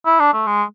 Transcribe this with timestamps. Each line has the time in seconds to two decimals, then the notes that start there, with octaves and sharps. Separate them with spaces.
0.06 E4
0.20 D4
0.34 A3
0.47 G#3